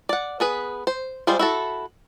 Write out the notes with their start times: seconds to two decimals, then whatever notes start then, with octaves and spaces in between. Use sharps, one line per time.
0.09 D5 F#5
0.40 B3 G#4 B4
0.87 C5
1.27 G3 G#3 F4 G#4 C5
1.39 E4 F#4 A4